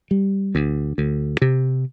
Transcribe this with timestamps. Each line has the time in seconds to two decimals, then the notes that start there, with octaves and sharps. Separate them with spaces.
0.11 G3
0.55 D2
0.98 D2
1.42 C3